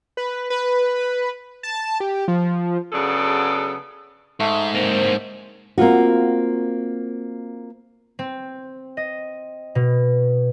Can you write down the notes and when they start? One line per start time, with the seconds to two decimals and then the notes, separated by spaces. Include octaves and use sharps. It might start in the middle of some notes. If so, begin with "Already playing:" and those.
0.17 B4
0.50 B4
1.63 A5
2.00 G4
2.28 F3
2.92 C#3 F#3 B3 D4 G#4 A4
4.40 G#2 A3
4.75 A#3 C4 C5
5.78 A#3 C4 F4 F#4
8.19 C4
8.97 D#5
9.75 B2